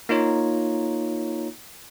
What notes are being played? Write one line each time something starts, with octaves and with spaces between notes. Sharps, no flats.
A#3 D#4 F4 C#5 A#5